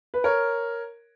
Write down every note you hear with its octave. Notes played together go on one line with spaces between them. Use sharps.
B4
A#4 C#5